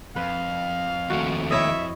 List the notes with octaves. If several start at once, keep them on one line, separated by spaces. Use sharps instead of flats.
F2 B4 F5
D#2 A3 F#4
E4 C#5 D#5 E5